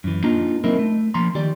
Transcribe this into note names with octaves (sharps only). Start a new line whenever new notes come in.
F#2 E3
A#3 D4 D#4 F4 A#5
F#3 A#3 C4 D#4 E4 A#4
A3
F3 A#3 A#5 C6
D#3 G4 D5